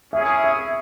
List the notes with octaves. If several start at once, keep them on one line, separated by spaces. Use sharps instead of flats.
C#4 E4 G#4 E5
E5